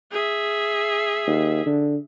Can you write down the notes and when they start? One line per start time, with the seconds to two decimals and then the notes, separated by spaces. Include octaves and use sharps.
0.12 G#4 E5
1.27 D#2
1.66 D3